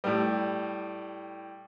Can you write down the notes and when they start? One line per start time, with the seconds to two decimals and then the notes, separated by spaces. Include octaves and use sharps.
0.04 A2 G3